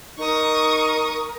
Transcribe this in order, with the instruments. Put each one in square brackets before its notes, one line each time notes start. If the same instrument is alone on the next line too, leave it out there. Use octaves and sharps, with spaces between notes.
[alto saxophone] D#4 [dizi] A#4 [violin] C#6 D#6